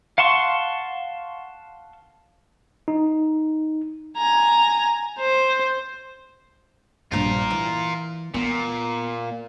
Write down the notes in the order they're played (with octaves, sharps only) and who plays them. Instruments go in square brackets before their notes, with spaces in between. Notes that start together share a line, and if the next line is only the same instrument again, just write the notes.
[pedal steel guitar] F5 F#5 A5 C6 C#6
[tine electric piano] D#4
[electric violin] G#5 A#5
C5
[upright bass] A#1 G2 [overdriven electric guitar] F4 A#4
[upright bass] E3
[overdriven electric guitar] A#2 [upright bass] B3